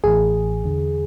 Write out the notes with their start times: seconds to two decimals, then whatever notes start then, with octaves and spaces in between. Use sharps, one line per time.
0.04 A1 A2 E3 G#4
0.64 E2 D3